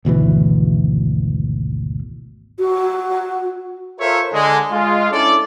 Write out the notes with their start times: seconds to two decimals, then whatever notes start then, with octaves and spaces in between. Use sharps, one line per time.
0.05 G#1 D2 B2 E3
2.59 F#4
4.00 F4 A4 A#4 C5 C#5 E5
4.33 D3 G#3
4.72 G#3 F4
5.11 C#4 D4 E4 A4 D5